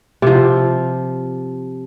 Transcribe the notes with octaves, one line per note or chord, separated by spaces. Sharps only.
C3 F3